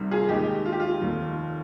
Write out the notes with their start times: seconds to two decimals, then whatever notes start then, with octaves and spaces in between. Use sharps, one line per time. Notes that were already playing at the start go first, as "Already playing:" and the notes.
Already playing: C2 C3 D#3 G3
0.11 F4 G#4
0.29 D#2 D#3 G#3 D#4 G4
0.65 F4
0.72 G4
0.80 F4
1.01 F1 D#2 D#3